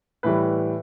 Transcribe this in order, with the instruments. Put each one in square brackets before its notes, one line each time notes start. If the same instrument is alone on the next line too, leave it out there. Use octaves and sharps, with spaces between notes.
[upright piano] A2 E3 G3 B4